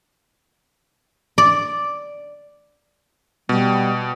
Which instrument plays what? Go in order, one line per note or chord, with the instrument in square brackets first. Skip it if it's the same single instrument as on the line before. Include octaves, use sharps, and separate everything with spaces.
[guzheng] D5
[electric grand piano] B2 [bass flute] G3